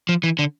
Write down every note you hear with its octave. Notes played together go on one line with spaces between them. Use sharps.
F3
E3
D3